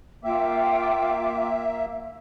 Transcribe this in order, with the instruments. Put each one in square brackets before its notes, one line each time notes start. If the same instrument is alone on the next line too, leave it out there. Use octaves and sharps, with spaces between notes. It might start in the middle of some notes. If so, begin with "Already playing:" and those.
[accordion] A#3 E5 [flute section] F4 G5 D6